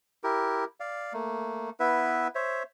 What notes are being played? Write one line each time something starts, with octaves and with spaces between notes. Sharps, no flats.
E4 G4 A#4
D5 F5
A3 A#3
B3 E4 B4 E5
C5 C#5 E5